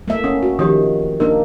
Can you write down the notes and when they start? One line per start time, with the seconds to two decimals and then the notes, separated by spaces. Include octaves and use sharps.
0.08 A3 A#3 E5
0.24 C#4 F#5 D#6
0.43 F#4
0.59 D#3 F3 G4 C#5 D#6
1.20 A#3 D4 D#4 A#4 B4